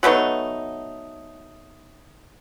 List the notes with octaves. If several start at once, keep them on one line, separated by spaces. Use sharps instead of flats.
F#3 A3 B3 D#4